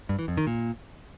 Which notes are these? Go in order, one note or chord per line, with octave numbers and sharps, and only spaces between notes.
G2
E3
F2
D#3
A#2